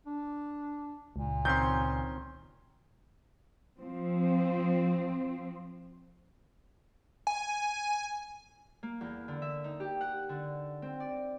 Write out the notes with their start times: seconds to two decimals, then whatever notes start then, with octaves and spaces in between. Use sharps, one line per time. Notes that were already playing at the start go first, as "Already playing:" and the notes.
0.06 D4
1.16 C#2 A#2
1.45 D#3 C4 C#4 C6 G6
3.81 F3 C4
7.27 G#5
8.83 A#3
9.01 E2
9.28 D3
9.42 E5
9.64 D#4
9.80 G4
10.01 F#5
10.29 D3
10.82 C4
11.00 D5